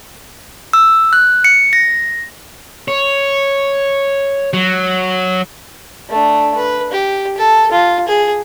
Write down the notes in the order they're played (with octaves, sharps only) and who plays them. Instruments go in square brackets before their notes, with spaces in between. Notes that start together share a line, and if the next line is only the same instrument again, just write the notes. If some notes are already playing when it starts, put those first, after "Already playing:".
[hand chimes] E6
F#6
C#7
A#6
[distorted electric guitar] C#5
F#3
[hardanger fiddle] A3 D4
B4
G4
A4
F4
G#4